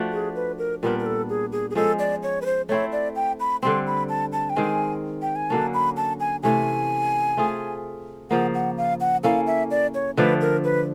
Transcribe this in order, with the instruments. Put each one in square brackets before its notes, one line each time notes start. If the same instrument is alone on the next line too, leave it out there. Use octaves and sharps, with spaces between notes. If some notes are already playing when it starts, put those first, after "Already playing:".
Already playing: [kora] F3 A3 D4 F#4
[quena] G#4
B4
A#4
[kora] A#2 G3 B3 D4 [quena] A#4
[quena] A#4
A4
G#4
G#4
G#4
[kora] F3 G#3 C#4 [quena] A4
[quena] D5
C#5
B4
C5
[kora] A3 C4 E4 [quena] C#5
[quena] D5
G5
B5
[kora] D3 G3 C4 [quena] C6
[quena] B5
A5
A5
G5
[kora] D#3 G#3 C4 [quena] G#5
[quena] G5
G#5
[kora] D3 F#3 A#3 C#4 [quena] A5
[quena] B5
A5
G#5
[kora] C3 E3 A3 C#4 [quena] G#5
[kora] A3 C4 F4 G#4
[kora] C#3 F3 A#3 [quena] F#5
[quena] F#5
F5
F#5
[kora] A#3 C#4 E4 A4 [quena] F5
[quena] E5
D5
C#5
[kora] D3 F3 A3 D4 [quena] B4
[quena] A#4
B4